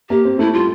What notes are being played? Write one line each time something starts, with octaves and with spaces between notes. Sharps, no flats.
A#3 G4
C4
A3 E4
G3 F4